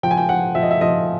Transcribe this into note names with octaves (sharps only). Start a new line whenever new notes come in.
F3 G5
G#5
G5
F3 F#5
F3 E5
D#5
E5
F3 D#5